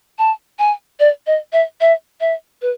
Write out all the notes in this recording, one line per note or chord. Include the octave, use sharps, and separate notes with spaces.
A5
G#5
D5
D#5
E5
E5
E5
B4